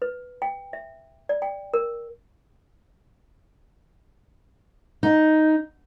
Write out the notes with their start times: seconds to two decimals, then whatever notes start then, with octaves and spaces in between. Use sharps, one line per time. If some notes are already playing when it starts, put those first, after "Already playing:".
0.02 B4
0.42 G5
0.73 E5
1.29 D5
1.42 G5
1.74 A#4
5.03 D#4